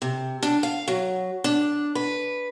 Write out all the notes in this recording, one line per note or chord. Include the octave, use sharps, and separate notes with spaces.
C3
D4
F5
F#3
D4
B4